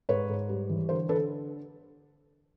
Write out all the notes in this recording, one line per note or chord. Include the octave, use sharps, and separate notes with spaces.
G#2 B4 C#5
G#2
G3
E3
D3 A#4 C5
D3 A4 B4